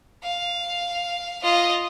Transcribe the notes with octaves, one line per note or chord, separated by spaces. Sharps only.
F5
F4 D#5